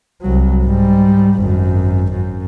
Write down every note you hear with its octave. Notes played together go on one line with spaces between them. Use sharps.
C2 F#3
G#2 G3
G#1 F#2
F#2